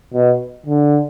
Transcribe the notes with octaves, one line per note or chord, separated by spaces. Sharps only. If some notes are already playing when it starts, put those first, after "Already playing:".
B2
D3